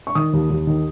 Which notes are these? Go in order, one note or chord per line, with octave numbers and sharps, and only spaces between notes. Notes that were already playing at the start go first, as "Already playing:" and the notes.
C#6
D#3 D#6
D#2
D#2
D#3